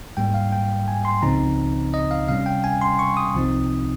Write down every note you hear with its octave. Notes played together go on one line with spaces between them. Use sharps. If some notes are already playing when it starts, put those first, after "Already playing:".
G#2 G3 A#3 G5
F5
G5
G#5
C6
C#2 C#3 F3 C4 D#4 A#5
D#5
F5
C3 G3 C#4 F5
G5
G#5
C6
C#6
D#6
C2 C3 F3 C4 D#4